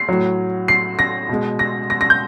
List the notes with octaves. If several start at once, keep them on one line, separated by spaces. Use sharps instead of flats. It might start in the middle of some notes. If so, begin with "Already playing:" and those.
Already playing: C7
A2 F#3
C7
A#6
B2 G#3
A#6
A#6
A#6
G6